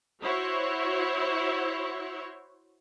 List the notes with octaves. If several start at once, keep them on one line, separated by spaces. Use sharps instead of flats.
E4 F#4 C5 C#5